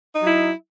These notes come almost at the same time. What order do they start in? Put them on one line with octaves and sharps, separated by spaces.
D#4 F#3 E4